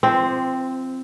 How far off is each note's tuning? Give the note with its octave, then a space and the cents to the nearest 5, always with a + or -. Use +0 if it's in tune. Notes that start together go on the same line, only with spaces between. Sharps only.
F3 -25 C4 +0